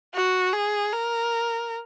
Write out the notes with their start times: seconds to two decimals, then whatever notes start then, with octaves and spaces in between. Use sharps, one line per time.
0.14 F#4
0.53 G#4
0.93 A#4